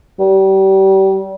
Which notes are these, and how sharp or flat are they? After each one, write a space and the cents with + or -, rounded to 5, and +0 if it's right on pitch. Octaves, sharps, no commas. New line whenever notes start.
G3 -30